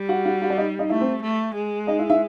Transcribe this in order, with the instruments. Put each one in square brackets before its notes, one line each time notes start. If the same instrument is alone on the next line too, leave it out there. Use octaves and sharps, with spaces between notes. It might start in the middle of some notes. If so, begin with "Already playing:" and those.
Already playing: [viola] G3
[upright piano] F#4 F#5
F#4 F#5
F#4 F#5
D5
D#4 D#5
D#4 D#5
[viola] A3 [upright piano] E4 E5
[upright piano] C4 C5
[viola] A3
G#3
[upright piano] D#4 D#5
E4 E5
E4 E5